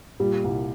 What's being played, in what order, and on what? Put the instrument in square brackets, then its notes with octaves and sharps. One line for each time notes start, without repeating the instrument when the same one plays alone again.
[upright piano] A#2 [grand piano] G3
[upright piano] C2